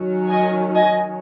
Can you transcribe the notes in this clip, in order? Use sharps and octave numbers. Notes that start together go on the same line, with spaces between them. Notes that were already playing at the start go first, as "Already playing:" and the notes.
Already playing: D#3 F#3 C#4
D#5 G#5
D#5 G#5